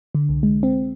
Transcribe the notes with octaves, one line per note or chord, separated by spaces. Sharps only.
D3
C2
G#3
C4